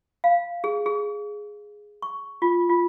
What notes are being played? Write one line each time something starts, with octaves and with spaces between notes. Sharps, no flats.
F5
G#4
G#4
C#6
F4
F4